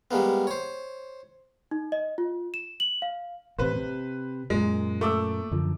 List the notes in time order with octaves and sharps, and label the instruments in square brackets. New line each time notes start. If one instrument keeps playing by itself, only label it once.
[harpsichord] G3 G#3 A#3 B3
C5 C#5
[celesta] D#4
D#5
F4
E7
F#7
F5
[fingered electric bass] A1 C3 [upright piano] B4 C5
[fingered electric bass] C3
[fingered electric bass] F#2 A#2 [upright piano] G#3
[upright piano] A3 D6 E6
[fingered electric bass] F#2 D3 F3